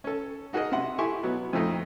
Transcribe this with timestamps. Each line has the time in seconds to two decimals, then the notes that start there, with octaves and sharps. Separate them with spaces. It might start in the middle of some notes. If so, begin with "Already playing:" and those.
0.04 C#4 A4
0.53 D#4 F#4 G#4 A#4 D#5
0.72 C3 E5 F#5 C6
0.98 E4 G4 A4 G#5 C6 C#6
1.23 B2 F#3 B3
1.53 F2 A#2 F3 A3 D#4